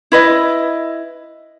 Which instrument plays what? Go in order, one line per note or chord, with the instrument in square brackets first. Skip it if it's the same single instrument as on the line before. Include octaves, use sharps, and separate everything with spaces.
[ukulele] E4 B4 D#5